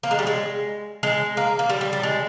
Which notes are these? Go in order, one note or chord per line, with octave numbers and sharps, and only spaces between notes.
A#3
G#3
G3
G#3
G#3
A#3
A#3
G3
G3
G3
G#3